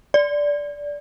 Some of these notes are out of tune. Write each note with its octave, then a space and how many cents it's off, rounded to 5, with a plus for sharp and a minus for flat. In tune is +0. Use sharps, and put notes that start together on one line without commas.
D5 -10